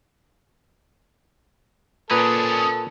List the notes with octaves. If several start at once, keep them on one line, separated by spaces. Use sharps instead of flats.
A#2 C#4 D4 A4 B4 A#5 D#6